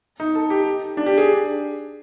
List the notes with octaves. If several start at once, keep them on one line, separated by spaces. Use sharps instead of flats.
D#4
A4
G4
D4
G4
G#4